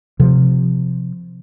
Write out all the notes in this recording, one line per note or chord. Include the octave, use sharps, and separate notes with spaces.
C3 F3